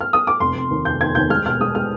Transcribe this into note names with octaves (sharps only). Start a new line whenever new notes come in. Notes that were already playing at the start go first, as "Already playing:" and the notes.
F6
D#6
D6
F1 C6
F1
D#2
F1 G6
D#3 G#6
D#2 G6
G#3 F6
B2 F6
G#3 D#6
G#3 F6